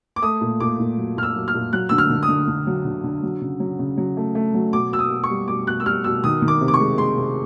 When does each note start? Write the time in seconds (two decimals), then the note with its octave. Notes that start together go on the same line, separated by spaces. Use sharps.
0.16 D6
0.22 A3 D#6
0.41 A#2
0.60 A#2 D6
0.79 A#2
0.98 F#3
1.17 A#2 F6
1.23 E6
1.36 F#3
1.48 F6
1.54 A#2
1.73 F#3 F#6
1.89 D3 E6
1.98 F6
2.10 D3
2.23 D#6
2.28 D3
2.48 D3
2.67 F#3
2.85 D3
3.04 D3
3.23 F#3
3.41 C#3
3.60 F#3
3.79 C#3
3.97 F#3
4.17 A3
4.35 A3
4.54 F#3
4.73 B2 D6
4.92 B2 E6
4.99 D#6
5.10 B2
5.24 C#6
5.30 G3
5.48 B2 D6
5.67 B2 F#6
5.80 E6
5.86 G3 F6
6.04 B2 E6
6.24 D#3 D#6
6.42 D#3
6.48 D6
6.61 C3
6.68 D6
6.74 C#6
6.80 G#3
6.98 G#3 C6
7.17 C3